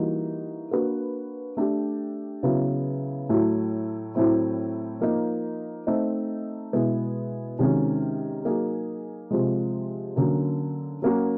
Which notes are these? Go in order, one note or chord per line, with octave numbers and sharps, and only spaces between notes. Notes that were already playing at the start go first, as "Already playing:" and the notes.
Already playing: E3 G3 A#3 D#4 F#4
A#3 D4 F#4 B4
A3 D4 G4
C#3 F#3 B3 E4
A2 F#3 A3
A2 F#3 A3 C4 E4
F3 A#3 D#4
A3 C4 D#4
B2 G#3 B3 E4 G#4
C3 D#3 G#3 C#4 F#4
F#3 A#3 D#4 G#4
C3 F3 G#3
D3 F#3 A#3 C#4
F#3 A#3 C#4 F#4